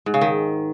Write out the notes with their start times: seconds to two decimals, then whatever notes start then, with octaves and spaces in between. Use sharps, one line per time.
0.06 G#2
0.14 C#3
0.21 D#3